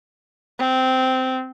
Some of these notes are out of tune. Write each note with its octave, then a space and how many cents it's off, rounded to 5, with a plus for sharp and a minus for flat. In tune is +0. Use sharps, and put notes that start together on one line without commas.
C4 -15